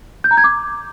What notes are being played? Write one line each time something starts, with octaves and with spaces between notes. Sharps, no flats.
G6
A#5
G#6
D6